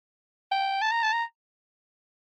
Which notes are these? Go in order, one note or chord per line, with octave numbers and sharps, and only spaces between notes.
G5
A5
A#5
A5
A#5